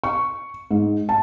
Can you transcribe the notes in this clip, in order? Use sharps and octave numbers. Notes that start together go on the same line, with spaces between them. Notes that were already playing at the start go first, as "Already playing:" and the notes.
C#6
G#2
A5